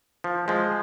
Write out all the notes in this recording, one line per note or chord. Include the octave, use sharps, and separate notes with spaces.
F3
F3 G#3